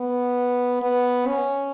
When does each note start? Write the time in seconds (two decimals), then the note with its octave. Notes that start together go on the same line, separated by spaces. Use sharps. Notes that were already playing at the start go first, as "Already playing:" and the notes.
Already playing: B3
0.82 B3
1.27 C#4